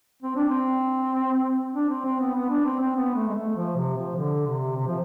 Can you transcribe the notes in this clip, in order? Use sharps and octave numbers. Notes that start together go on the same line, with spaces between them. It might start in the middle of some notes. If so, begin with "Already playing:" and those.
C4
D4
C4
D4
C4
C4
B3
B3
D4
C4
C4
B3
A3
G#3
A3
F3
C3
F3
D3
C3
C3
F3